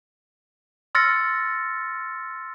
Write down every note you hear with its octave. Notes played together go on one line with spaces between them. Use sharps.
C6 E6 F6 A6 A#6 C#7